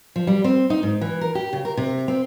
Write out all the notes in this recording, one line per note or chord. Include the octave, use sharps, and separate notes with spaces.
F3
G3
C4
D#4
G#2
E3
A#4
G4
C#3
A#4
C3
C4